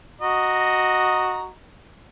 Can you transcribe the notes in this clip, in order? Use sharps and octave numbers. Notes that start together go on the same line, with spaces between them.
F#4 D#5 A#5